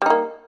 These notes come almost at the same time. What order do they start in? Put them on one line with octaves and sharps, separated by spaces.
G3 D#4 A#3